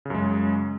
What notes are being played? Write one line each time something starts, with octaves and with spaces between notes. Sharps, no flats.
F#2 C#3 G#3